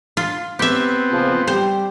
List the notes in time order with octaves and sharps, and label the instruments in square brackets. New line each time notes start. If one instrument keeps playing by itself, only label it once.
[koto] F4
[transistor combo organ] B3 C4 [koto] G4 E5
[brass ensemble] A#1 C#3 F3
[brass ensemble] G3 G4 [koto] C5